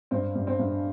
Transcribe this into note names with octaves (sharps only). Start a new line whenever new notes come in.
G2 C4
G2
C4
G2